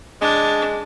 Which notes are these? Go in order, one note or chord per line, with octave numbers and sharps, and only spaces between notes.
G#3 D4